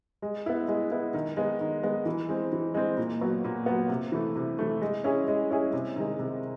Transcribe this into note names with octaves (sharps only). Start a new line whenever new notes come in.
G#3
B3 E4
G#3
B3 E4
D#3
G#3 B3
D#3
G#3 B3
E3
G#3 C4
E3
G#3 C4
A#2
F#3 B3
A#2
F#3 B3
C3
E3 A3
C3
E3 A3
G#3
C#4 E4 G#4
G#3
C#4 E4 G#4
C3
D#3 G#3
C3